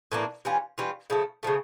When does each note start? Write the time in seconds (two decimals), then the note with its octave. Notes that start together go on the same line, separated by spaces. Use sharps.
0.12 A2 E3 A#3 D4
0.45 E3 G3 C#4 F4
0.78 E3 G3 C#4 F4
1.10 C#3 F3 A3
1.43 C#3 F3 A3